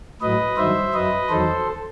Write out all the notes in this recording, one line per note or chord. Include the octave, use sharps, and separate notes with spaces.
A2 F#3 B4 D#5
G2 D#3 F#3 C5 E5
F#2 F#3 B4 D#5
E2 D#3 F#3 A4 C5